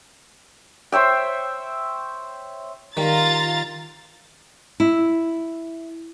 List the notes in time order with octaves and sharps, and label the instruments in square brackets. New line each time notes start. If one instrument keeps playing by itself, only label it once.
[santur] C5 C#5 E5 G5
[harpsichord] D#3 G3 [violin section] F4 A#5 A6
[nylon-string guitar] E4